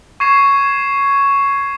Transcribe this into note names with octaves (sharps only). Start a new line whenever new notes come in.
C#6 G#6 C7 E7